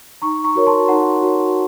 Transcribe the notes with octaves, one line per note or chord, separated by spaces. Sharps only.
D#4 A#5 C#6
A#5 C#6
F#4 A#4 C#5
A5 C6
D#4 F#5 A#5
F#4 A#4 C#5